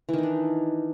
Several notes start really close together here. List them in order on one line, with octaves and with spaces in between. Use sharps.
E3 D#3 D#4 D4